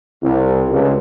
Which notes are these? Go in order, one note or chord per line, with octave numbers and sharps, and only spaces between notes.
C2
C#2